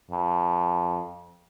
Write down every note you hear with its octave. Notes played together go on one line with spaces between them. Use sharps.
F2